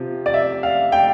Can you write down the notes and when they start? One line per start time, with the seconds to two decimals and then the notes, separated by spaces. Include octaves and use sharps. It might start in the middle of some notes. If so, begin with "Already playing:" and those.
Already playing: C3 F3
0.26 D5
0.34 E5
0.63 F5
0.92 G5